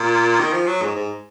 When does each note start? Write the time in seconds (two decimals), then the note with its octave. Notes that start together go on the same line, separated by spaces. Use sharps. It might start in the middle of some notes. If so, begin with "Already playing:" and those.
Already playing: A#2
0.39 D#3
0.53 F3
0.67 F#3
0.82 G#2
0.96 G#2